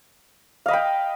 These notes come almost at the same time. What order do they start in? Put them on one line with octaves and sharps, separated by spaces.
F5 D#5 B5 G5